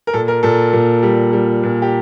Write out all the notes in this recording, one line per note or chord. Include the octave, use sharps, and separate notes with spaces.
A#4
A#2 A4
A#4
A#2 A4
A#2
G3
G3
A#2
G4